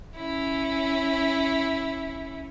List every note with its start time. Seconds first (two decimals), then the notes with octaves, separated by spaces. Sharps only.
0.16 C#4 E4